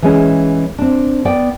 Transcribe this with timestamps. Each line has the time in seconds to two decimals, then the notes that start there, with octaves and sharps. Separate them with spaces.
0.02 E3 G#3 C#4
0.79 C4 D4
1.25 B3 D5 G5